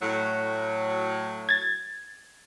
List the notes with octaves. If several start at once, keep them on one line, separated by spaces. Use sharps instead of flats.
A2 F#3
G#6 A6